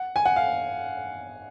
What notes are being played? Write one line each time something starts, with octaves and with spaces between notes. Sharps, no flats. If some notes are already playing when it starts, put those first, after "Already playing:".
Already playing: F#5
G#5
F#5
F5